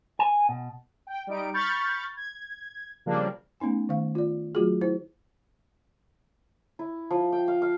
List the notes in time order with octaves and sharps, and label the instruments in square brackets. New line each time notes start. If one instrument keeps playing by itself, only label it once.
[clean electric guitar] G#5
B2
[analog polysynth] G5
G3 D#4 D7
B5 C#6 F6 G6 A6
G#6
C#3 F3 G3 A#3 D4
[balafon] A3 B3 C#4 D#4 G#5
D#3 A3 F5
F4 D5
F#3 A3 F4 F#4 G#4
E4 C5
[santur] E4
F3
G5
F5
F5